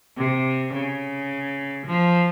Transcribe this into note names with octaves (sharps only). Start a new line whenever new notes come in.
C3
C#3
F3